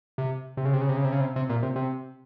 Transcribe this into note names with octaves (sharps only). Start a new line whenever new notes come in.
C3
C3
C#3
C3
C#3
C3
C#3
C3
C#3
C3
C3
A#2
C3
C3